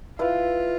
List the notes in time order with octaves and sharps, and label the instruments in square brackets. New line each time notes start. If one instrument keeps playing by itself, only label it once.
[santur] E4 B4 F5 [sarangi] F4